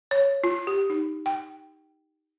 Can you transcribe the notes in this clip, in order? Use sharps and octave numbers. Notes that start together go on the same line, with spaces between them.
C#5
F4
G4
D#4
G5